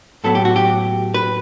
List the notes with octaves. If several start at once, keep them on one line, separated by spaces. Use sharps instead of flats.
A2 F#3 B3 A4
G4
F#4
G4
B4